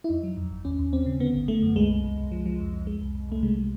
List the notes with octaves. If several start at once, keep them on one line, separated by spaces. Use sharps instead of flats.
E4
F2 D#4
F#3
F2
G1
D#2 C#4
D#2
D#2 C4
C#3
D3 B3
G#1
D3 A3
F#2
C2 G#3
C2
C2
C2
F3
F3
F2
F2
G#3
C2
C2
C2 A3
C3 G#3
G3